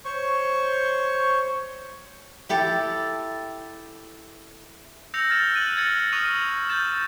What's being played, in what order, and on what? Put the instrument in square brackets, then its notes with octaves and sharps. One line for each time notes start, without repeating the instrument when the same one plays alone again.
[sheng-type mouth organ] C5 C#5 C#6
[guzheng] E4 G4 A4
[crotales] E6 G6 A#6 C#7 F7
F6 A6 E7
F#6 D#7 F#7
G#6 A6 C#7
C#6 D#6 F6 D#7 F7 F#7
G6 A6 E7